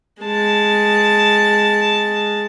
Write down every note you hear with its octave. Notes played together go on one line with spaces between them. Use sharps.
G#3 A5